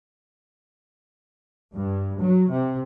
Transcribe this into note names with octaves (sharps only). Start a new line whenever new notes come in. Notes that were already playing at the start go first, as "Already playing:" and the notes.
G2
F#3
C3